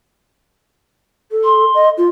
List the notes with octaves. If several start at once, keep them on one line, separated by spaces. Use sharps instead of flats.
A4
C6
D#5
F4